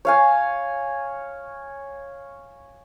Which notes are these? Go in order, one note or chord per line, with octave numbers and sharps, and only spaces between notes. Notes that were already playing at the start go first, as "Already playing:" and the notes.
C#5 F5 G#5